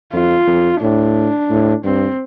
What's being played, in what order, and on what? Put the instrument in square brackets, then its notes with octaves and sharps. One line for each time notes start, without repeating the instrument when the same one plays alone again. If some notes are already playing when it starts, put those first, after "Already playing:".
[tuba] F2 [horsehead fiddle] F4
[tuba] F2
[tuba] A2 [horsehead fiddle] D4
[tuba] A2
[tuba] G2 [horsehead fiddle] C4